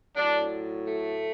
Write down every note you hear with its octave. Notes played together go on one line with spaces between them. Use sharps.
A2 F#3 D4
A3